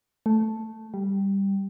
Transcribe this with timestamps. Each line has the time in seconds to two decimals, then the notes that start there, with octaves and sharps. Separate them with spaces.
0.26 A3
0.94 G3